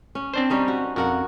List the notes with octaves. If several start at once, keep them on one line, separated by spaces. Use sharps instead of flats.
C#4
C4 D4 C5
G3 C#4 D#4
F#4
F2 F#4 A#4 F#5